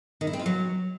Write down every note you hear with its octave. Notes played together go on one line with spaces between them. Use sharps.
D#3
E4
C4
F4
F#3